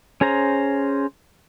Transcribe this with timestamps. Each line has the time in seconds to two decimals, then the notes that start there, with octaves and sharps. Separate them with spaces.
0.21 C#4 G#4 C5 A#5